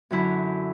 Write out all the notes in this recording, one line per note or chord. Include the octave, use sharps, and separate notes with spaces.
F#2 D3 F#3 E4